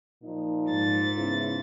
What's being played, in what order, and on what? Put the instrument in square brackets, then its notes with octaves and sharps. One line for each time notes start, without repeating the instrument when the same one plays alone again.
[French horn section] A#2 F3 D#4
[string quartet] G#2 A6
[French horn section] C#3 B3 E4